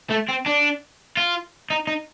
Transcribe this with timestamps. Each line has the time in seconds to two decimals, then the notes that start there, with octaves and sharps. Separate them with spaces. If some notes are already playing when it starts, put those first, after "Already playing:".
0.10 A3
0.28 C4
0.46 D4
1.17 F4
1.70 D#4
1.87 D#4